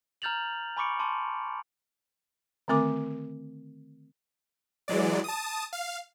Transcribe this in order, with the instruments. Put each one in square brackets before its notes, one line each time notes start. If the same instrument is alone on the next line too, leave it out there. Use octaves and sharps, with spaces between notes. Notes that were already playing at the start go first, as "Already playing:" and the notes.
[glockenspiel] A#5 F6 G6 A6 F7 F#7
G#5 B5 C#6 D6 C#7 D7
A5 C6 D6
[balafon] D3 D#3 A3 C4 A#4 D6
[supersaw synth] E3 F#3 G#3 D5
A5 D#6
F5